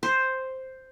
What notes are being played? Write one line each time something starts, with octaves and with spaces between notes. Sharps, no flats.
C5